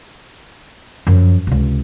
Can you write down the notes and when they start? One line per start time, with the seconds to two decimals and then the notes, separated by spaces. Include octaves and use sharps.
1.07 F#2 F3
1.47 C#2 C3